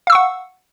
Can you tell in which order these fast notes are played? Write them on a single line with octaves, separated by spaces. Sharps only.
F5 E6 C#6 F#5